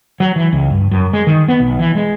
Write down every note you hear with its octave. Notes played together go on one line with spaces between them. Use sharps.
F#3
E3
C#2
G2
F#2
G#3
D#3
B3
B1
E3
G#3